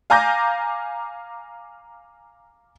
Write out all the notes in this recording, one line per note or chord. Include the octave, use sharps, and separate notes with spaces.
F5 G#5 A#5 D6 G6 A#6